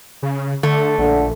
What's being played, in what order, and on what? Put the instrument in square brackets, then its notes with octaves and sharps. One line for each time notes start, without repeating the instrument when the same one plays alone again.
[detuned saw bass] C#3
[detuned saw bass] D3 [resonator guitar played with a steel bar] A3
[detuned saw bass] A#1 [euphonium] D3